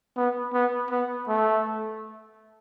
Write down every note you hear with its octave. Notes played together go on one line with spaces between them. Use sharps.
B3
B3
B3
A3